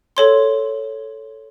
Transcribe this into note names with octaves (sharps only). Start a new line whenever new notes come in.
A4 C#5 C6